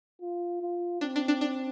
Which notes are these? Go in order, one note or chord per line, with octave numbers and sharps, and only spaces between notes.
F4
F4
C4 D4
D4
D4
D4